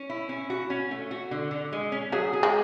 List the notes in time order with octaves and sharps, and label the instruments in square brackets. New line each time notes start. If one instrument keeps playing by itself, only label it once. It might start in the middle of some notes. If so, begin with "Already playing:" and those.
Already playing: [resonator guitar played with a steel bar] C#4
E4
C#4
F#4
C#4
A3
F#4
D3
D3
G#3
C#4
[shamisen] F#3 [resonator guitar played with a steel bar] G#4
[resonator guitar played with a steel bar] G#4
[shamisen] G#3